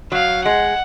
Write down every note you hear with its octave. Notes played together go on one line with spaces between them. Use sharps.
F#3 F5
G#3 F#5